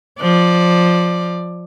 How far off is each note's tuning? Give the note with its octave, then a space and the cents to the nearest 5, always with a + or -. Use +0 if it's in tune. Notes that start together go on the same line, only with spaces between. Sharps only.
F3 +10 D5 +10